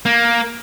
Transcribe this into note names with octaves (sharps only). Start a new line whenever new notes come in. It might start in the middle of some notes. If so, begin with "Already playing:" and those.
A#3